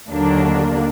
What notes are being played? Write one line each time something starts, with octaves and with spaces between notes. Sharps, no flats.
D#2 D3 F#3 A#3 D4